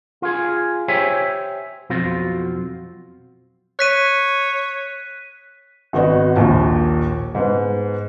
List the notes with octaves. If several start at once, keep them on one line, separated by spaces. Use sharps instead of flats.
F4 G#4
G4 C5 C#5 E5 G5 G#5
B1 F2 B2 C4 F4 F#4
C#5 F#6 B6 D#7
G#1 B3 F#4 D#5
A#1 D#2 A#2
G#2 B3